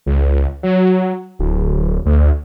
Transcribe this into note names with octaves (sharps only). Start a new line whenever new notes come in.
C#2
F#3
D1
D2